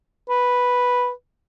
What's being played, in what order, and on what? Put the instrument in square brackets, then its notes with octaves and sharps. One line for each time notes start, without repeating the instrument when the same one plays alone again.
[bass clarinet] B4